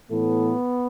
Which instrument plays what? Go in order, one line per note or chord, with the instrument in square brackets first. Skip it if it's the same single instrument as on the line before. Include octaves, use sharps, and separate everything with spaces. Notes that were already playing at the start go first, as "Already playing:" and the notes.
[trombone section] A2 E3 A3 B3